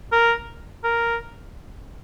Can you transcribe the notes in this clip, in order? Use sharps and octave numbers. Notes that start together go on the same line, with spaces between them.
A#4
A#4